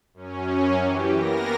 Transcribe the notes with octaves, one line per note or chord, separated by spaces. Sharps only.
F#2 C#4
E3 G4
A#3 B3 A#4 A#6